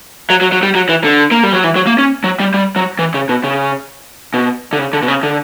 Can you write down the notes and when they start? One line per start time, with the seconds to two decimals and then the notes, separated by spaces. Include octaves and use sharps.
0.30 F#3
0.41 F#3
0.52 F#3
0.63 G3
0.75 F#3
0.89 E3
1.04 D3
1.31 A#3
1.43 G3
1.53 F#3
1.64 E3
1.76 F#3
1.87 A#3
1.98 C#4
2.24 F#3
2.40 G3
2.54 G3
2.76 F#3
2.99 E3
3.14 C#3
3.29 B2
3.44 C#3
4.34 B2
4.73 D3
4.79 C#3
4.93 D3
5.02 B2
5.08 C#3
5.23 D3